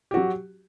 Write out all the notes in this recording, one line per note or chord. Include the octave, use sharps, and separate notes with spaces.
F#3 F#4 G4